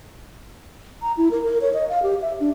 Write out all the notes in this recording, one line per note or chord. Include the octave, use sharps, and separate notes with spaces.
A#5
E4
A#4
A#4
C#5
D#5
F5
G4
E5
D4